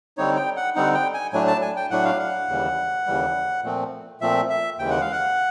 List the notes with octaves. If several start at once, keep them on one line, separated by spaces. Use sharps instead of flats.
D3 G3 C4 D#4 C#5
G5
F#5
D3 G3 C4 D#4 F#5
G5
G#5
A2 F#3 A3 D4 G#5
A5
G#5
G5
A2 F#3 A3 D4 F#5
F5
F#5
D#2 C#3 E3 G3
D#2 C#3 E3 G3
A#2 F3 A3 C4
A#2 F3 A3 C4 E5
E5
D#2 C#3 E3 G#3 G5
F#5
F5
F#5